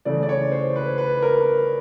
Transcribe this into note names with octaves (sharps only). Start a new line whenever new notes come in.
C#3 E3 A3 D5
D5
C#5
C5
B4
B4
A#4